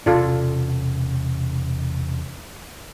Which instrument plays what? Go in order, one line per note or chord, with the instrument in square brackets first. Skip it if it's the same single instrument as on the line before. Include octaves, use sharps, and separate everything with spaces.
[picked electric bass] E1 C3 C#4 [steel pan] F4 A4 D5